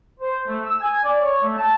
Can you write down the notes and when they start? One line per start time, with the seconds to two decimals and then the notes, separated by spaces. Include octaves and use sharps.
0.20 C5
0.47 A3
0.66 E6
0.81 G#5
1.04 D5
1.21 C#5
1.42 A3
1.57 A5